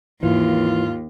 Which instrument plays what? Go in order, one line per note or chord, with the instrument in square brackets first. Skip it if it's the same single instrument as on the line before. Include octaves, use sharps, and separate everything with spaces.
[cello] D#2 [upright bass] G#2 [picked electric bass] E3 [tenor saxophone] F4